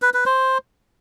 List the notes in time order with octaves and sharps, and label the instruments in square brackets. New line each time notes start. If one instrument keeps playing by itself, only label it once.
[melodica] B4
B4
C5